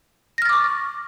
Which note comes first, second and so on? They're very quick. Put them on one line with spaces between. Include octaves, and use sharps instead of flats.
A#6 F6 A6 D6 C#6